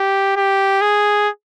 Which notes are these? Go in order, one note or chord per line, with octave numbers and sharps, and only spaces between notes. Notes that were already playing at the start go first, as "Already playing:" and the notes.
Already playing: G4
G4
G#4